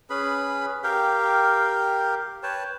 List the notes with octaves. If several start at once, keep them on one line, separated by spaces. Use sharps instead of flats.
C#4 G#4 B4 B5
G4 A#4 F5 G5
B4 C#5 G5 A5